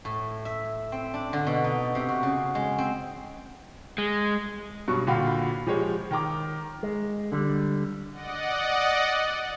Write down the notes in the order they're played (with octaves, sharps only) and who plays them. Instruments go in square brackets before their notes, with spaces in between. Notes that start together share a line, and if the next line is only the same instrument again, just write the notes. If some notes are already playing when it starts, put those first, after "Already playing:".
[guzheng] A2
E5
C4
D4
D3
B2
D#4
C3
F#4
C#3
G#3
C4
[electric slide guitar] G#3
[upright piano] G2 B2 F#3 C#6
A#2 D3 F#4 F5 G5 B5
F3 G#3 G4 C#5
D#3 G5 A#5 D6
[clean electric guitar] G#3
D3 G3
[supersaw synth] D5 D#5 F#5